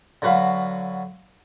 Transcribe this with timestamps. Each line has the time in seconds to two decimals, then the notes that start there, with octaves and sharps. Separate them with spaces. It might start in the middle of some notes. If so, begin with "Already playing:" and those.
0.22 D3 F#3 F#4 B4 F5